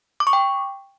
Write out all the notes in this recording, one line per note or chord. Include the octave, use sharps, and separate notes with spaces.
D6
C#6
G5